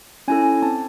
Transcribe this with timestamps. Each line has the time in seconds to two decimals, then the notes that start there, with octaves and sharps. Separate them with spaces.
0.28 C#4 E4 A4 G#5
0.62 C4 A5